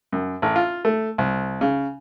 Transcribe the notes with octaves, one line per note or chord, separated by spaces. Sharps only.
F#2
A1
F4
A3
C2
C#3